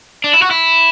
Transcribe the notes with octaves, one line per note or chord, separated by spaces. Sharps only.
D4
E4
F#4
E4